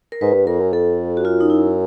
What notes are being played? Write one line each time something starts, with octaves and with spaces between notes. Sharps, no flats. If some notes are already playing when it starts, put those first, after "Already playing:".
A#4
G#2 B4
G2
F2 A#4
F#2
F2 A4
F#4
F#2 F4
D#4
E4